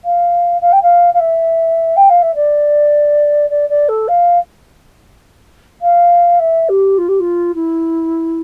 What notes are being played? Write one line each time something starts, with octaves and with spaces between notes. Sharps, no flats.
F5
F5
G5
F5
F5
E5
G5
F5
E5
D5
D5
D5
A4
F5
F5
E5
G4
F4
G4
F4
E4